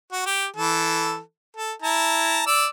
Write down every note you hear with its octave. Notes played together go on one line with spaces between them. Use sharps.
F#4
G4
E3 A4
A4
E4 A5 A#5
D5 E6